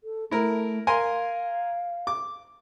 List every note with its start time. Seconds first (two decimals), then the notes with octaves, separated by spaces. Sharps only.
0.04 A4
0.31 A3 E4 A#4
0.87 A#4 F5 G#5 C6
2.07 D6